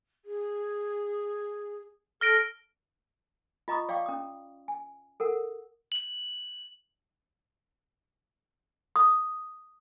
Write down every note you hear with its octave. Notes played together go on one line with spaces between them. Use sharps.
G#4
A4 F6 A#6 D7
F4 D#5 A#5 B5 C#6 D#6
D5 F5 G5 C#6 D6
C#4 D#6
G#5
A4 A#4 F#5
F#7
D#6